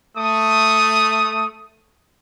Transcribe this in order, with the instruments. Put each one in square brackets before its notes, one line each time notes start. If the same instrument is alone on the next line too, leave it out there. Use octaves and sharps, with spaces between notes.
[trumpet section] A3 D#6